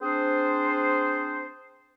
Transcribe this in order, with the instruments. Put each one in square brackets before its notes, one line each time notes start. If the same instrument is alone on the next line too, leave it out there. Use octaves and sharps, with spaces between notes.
[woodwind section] C4 D4 G#4 C5